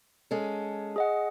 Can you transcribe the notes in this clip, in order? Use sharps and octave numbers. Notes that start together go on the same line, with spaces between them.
G#3 C#4 A4
G#4 D#5 F#5